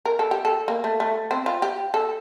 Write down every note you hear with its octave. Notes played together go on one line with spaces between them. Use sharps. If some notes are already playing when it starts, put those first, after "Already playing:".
A#4
A4
G4
A4
A#3
A3
A3
C4
F4
G4
A4